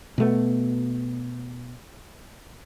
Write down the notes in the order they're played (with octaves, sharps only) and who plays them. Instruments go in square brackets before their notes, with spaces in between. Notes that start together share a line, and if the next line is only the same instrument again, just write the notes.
[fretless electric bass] B2 A3 B3